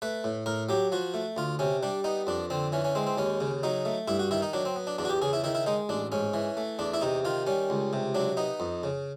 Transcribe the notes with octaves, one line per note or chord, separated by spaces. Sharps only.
A3 B4
A2
A2 A#4
F#3 G4
F3 F#4
A3
D2 F4
C3 C#4
G3 D4
B3 D#4
F2 D4
D3 C4
E3 C#4
C#4
G#3 C4
C4
D#2 C#4
C#3
F#3 D#4
A3
G2 E4
F#4
D#3 E4
D#4
F#3 D4
C4
B3
D4
E2 D4
F#4
G4
C#3 G#4
E4
D#3 E4
E4
G#3 D#4
A1 D4
G#2 C#4
E3
A3
E2 D4
E4
C3 D#4
D#3 F4
G3 C#4
C#2
C3
F#3 D4
B3 D#4
F2
C#3